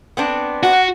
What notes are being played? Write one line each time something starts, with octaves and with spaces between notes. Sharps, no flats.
B3 C4 D4
F#4 F#5